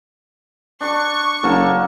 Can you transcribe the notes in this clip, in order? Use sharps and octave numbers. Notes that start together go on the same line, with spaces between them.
D4 C#6 D6
F#1 A#3 A4 F#5